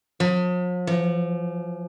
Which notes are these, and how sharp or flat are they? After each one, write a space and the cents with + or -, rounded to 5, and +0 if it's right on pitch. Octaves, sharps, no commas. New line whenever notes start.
F3 +45
F3 -35